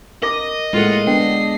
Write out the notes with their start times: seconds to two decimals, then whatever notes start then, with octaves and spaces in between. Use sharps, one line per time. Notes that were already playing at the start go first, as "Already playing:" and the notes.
0.22 A#4 D#5 D6 A#6
0.73 A2 G#3 A#3 F4 F#5
1.07 B3 D4 G5 C7